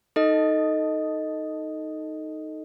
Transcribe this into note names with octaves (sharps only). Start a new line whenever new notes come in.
D#4 A4 D#5